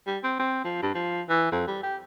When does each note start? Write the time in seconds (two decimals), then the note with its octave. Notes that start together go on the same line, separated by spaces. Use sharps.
0.06 G3
0.24 C4
0.39 C4
0.64 F3
0.82 G2
0.94 F3
1.29 E3
1.52 F2
1.67 G3
1.83 G4